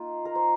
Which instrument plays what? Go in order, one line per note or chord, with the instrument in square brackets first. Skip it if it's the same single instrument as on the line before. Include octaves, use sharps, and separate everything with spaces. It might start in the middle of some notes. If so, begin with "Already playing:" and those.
Already playing: [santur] A#3 D#4 F4
A#4
C5